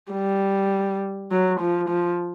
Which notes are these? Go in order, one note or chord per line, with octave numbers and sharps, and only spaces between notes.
G3
F#3
F3
F3